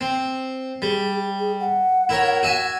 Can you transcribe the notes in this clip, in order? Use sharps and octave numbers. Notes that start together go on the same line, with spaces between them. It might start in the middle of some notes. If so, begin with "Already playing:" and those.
C4
G3 G#4
G#4
F#5
E4 A#4 C#5
F#4 E5 G#5